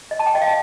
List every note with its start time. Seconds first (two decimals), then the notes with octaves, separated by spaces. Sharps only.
0.11 D#5
0.19 A5
0.26 G5
0.35 D#5
0.41 F5